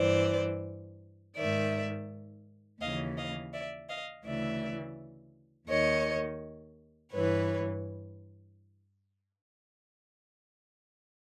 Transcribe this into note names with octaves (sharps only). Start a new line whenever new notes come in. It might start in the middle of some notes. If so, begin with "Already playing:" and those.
Already playing: G2 E3 C5 D5
G#2 D#3 D5 E5
D#2 C#3 E3 D#5 F5
D#5 F5
D5 E5
D#5 F5
D2 C#3 E3 D5 E5
D#2 D#3 C#5 D#5
G2 E3 B4 C#5